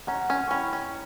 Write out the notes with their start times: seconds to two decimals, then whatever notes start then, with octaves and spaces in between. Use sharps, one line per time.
0.07 C#4 F#5 A#5
0.30 C#4
0.48 C#6
0.51 C#4 G5 B5
0.73 C#4